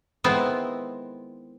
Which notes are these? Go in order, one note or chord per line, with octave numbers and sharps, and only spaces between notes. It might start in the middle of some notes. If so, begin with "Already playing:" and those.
D#3 G#3 B3 C4 E4